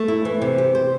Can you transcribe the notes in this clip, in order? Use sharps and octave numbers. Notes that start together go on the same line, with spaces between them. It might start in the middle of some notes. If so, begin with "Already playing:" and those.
Already playing: A3
E4
E3
C3
G4
C5